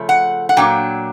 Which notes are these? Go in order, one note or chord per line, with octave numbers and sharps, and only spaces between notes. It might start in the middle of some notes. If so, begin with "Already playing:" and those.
Already playing: C#3 F3 A3
F#5
F#5
A#2 F#3 A#3 D4 G5